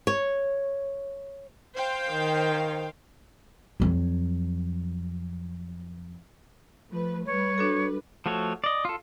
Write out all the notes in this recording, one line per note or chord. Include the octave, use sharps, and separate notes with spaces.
C#5
C5 F5 G5
D#3
F2 F#3
F3 A3 B4
G3 B4 C#5
D4 F#4 A4
F3 A3 F#4 A4 C#5
D5 D#5
F4 A4